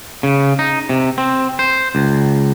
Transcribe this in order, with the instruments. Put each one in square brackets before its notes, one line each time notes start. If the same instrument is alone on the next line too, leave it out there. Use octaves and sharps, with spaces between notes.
[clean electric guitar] C#3
D#4
C3
C4
C5
C#2